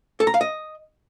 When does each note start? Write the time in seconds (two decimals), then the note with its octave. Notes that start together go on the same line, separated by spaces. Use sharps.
0.20 A4
0.27 A#5
0.34 F5
0.41 D#5